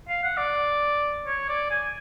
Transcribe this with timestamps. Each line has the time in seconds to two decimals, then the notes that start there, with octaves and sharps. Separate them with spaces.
0.09 F5
0.24 F#5
0.38 D5
1.27 C#5
1.49 D5
1.71 G#5